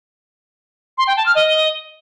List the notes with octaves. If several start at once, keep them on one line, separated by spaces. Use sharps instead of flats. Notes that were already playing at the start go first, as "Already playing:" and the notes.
C6
G5
A5
F6
D#5